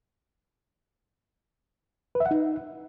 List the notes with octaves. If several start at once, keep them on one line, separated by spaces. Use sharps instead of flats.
B4
E5
F#5
D#4